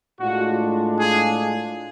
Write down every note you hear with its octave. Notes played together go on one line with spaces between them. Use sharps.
A2 G#3 D4 F4 F#4
G#4